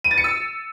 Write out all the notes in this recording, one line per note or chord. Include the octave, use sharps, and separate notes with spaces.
D#7
A6
C#7
E6